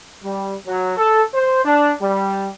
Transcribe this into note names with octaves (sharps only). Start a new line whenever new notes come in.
G3
F#3
A4
C5
D4
G3